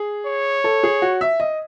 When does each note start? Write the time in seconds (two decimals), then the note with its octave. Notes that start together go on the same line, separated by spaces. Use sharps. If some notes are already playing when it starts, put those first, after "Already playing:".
Already playing: G#4
0.27 C#5
0.64 A4
0.83 G#4
1.02 F#4
1.21 E5
1.40 D#5